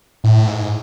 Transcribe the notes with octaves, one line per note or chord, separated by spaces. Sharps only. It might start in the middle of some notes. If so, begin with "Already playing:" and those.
A2
G#2